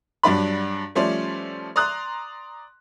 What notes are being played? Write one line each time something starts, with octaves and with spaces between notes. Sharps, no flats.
G2 F#3 D4 D5 B5
F3 G3 A3 C#4 C5 D5
D5 A#5 C6 D#6 F#6